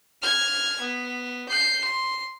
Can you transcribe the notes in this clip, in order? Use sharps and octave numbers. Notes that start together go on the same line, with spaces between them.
F6 G#6
B3
G6 C7
C6